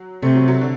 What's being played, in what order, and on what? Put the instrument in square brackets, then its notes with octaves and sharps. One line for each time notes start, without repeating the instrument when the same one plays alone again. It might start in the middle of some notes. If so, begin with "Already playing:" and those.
Already playing: [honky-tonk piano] F#3
[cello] C3 [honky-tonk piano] A3
[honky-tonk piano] F#3
F#3
D3